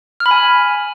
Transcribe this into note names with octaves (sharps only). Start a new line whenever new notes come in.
F6
B5
G#5